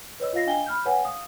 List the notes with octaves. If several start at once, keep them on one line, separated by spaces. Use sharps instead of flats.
B4 C#5 D#5 E6
F4 D#5 F5 A#6 C7
D4 D#5 F5 G5 G#5 G7
B5 F6 G6
B4 C#5 F#5 G#5
F5 D#6